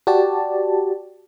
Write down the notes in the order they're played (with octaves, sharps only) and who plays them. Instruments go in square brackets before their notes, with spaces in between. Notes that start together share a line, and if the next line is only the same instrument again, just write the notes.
[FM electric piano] F#4 G4 D5 A5